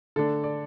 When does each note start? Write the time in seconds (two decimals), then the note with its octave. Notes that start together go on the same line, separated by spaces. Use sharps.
0.16 D3 A3 D4 A4
0.44 D5